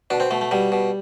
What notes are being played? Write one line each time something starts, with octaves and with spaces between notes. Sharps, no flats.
B2 D4
C4
B2 A3
A3
B2 G3
B2